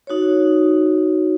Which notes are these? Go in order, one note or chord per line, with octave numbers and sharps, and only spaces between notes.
D#4 F#4 C#5